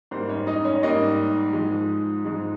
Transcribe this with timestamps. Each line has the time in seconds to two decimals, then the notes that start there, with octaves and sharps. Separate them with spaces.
0.11 G#2 G3 A#3 C5
0.29 C#4 C#5
0.47 D#4 D#5
0.65 C#4 C#5
0.83 G#2 G3 A#3 D#4 D#5
1.53 G#2 F3 G#3
2.24 G#2 F3 G#3